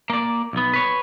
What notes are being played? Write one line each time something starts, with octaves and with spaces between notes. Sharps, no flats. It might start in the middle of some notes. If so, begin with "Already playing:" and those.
A#3 D5
B1 B3
B4 C#5